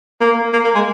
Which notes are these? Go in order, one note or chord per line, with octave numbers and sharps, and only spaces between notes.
A#3
A#3
A#3
G#3